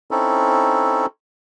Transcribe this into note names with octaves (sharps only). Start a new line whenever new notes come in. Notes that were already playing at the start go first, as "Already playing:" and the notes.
C4 C#4 D#4 E4 A4